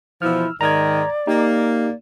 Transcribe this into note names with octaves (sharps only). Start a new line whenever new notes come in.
B2 E3 F3 E4 E6 F6
G#2 D#3 D5 A#5 G#6
A#3 D#4 G4